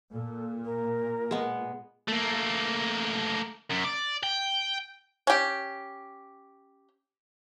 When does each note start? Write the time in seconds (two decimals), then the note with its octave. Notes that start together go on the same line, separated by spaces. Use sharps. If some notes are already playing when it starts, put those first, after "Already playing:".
0.13 A#2 A4
0.65 A#4
1.31 G#3 B3
2.08 A3 A#3
3.70 F#2
3.84 D5
4.23 G5
5.27 C#4 G4